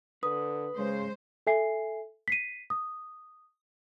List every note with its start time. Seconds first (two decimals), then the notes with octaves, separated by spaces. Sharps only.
0.23 D3 B4 D#6
0.76 C#3 G#3 C5
1.47 A4 E5 G#5 C7
2.28 B6 C7 D#7
2.70 D#6